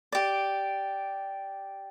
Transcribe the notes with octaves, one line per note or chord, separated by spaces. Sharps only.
G4 D5